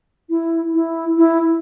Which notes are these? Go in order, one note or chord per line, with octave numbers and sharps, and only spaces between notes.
E4
E4
E4